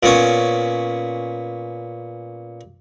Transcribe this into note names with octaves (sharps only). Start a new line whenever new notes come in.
A#2 B3 C#4